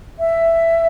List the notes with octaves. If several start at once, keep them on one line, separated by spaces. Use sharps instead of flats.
E5